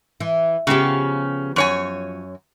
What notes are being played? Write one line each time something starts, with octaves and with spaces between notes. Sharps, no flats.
E3
C#3 F3 B3 C#4 G4
F#2 C#5 G#5